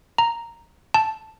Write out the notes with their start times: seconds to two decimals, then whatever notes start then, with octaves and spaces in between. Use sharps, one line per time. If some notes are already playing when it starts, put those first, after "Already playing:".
0.18 A#5
0.94 A5